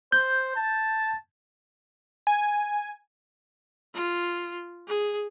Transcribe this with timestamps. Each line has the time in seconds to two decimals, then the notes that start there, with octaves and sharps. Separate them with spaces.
0.12 C5 G6
0.56 A5
2.27 G#5
3.94 F4
4.88 G#4